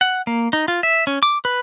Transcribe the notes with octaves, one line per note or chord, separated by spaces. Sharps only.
F#5
A#3
D#4
F4
E5
C#4
D6
B4